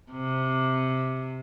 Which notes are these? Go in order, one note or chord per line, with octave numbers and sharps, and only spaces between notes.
C3